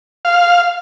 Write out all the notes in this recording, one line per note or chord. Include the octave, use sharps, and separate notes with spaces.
F5